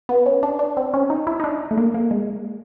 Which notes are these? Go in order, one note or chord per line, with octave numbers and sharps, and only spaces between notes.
B3
C#4
D4
D4
C4
C#4
D#4
E4
D#4
D4
A3
A#3
A#3
G#3